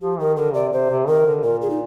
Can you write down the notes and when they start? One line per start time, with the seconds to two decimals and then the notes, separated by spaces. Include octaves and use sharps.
0.02 F3 G4
0.19 D#3 A#4
0.37 D3 A#4
0.54 C3 D5
0.72 C3 C5
0.90 C3
1.07 D#3 A#4
1.26 D3
1.44 A#2 A#4
1.62 G#4
1.70 D#4